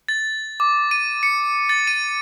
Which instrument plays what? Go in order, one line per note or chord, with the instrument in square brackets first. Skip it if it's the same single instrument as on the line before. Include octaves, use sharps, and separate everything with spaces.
[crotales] A6
D6
D#7
C#7
A6
D#7